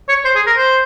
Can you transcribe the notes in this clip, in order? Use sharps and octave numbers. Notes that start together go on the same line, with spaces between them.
C#5
C5
G#4
A#4
C5